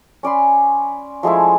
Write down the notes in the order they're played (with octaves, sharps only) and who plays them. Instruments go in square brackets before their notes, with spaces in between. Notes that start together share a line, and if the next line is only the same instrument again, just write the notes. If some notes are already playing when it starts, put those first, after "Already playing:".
[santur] C#4 D5 B5 C6
F3 G#3 A3 E4